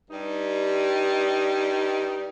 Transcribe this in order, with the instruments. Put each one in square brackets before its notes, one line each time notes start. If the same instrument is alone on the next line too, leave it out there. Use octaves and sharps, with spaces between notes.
[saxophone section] G2 G3 D#4